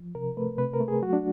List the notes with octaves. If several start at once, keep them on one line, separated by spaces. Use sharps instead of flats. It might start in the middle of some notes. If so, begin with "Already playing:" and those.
Already playing: F3
C3 A#4
A3 B4
C3 B4
A#4
A3
G#4
F#3 F#4
D4